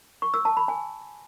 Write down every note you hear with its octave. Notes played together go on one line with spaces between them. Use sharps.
C#6
E6
A5
B5
G#5